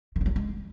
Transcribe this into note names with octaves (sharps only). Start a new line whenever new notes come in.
D#3
D3
F#3
G3
G#3